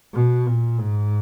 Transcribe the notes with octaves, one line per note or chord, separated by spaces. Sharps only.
B2
A#2
G#2